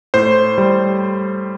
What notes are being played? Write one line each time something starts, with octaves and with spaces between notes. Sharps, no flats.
A2 C5
G3